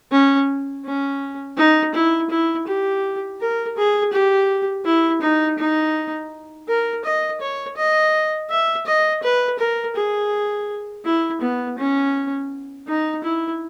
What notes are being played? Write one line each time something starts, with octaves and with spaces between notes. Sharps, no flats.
C#4
C#4
D#4
E4
E4
G4
A#4
G#4
G4
E4
D#4
D#4
A#4
D#5
C#5
D#5
E5
D#5
B4
A#4
G#4
E4
B3
C#4
D#4
E4